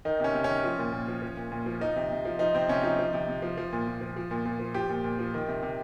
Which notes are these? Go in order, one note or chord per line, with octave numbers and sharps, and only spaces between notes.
D#3 D#4
C3 C#4
C3
C#4
D#3
F3
A#2
A#2
F3
F3
A#2
A#2
F3
F3 D#4
C3
C3
F3
F3 D#4
C3 C4
C3 C#4
F3 D#4
F3
C3
C3
F3
F3
A#2
A#2
F3
F3
A#2
A#2
F3
F3 G4
A#2
A#2
F3
D#3
C3
C3